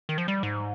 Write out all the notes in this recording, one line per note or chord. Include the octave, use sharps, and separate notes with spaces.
D#3
F3
G3
G#2